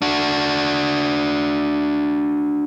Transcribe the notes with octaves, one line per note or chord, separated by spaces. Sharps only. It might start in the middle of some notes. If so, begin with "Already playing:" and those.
D4 F#4